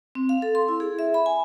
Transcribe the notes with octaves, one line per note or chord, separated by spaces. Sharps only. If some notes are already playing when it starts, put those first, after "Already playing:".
C4
F5
A4
C6
E4
G#4
E5
B5
G#5